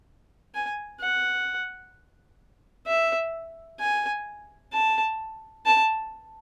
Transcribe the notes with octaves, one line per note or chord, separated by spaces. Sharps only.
G#5
F#5
E5
G#5
A5
A5